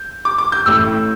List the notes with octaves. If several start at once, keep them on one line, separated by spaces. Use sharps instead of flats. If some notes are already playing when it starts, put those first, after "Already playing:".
Already playing: G6
D6
D6
G6
A1 A2 A3 E4 E6